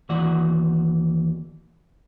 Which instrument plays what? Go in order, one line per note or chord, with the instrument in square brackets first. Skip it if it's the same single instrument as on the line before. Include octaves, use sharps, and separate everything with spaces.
[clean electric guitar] D#2 E3 F#4 D5 F#5